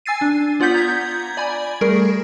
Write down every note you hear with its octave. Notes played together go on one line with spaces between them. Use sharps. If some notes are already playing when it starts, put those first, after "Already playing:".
G#5 E6 A6 C7 D#7
D4
B3 F4 D5 F#5 G6 B6
A#5 G6 G#6
D5 G#5 B5
G3 A3 G#4 A#4